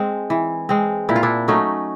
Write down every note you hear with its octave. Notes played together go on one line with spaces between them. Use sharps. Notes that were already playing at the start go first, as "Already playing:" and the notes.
Already playing: G#3 C4
E3
G#3 C4
A#2 E4
F4
D4 E4
F#3 A3 C#4 D#4